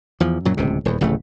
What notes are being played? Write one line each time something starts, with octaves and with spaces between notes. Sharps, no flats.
E2 F3
F#2 A#2 F#3
D1 C#2 C3
D#1 E2
D1 A1 C#3 A3